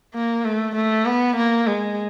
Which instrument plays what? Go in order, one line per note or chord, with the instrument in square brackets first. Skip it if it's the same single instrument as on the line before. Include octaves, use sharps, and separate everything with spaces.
[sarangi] A#3
A3
A3
B3
A#3
G#3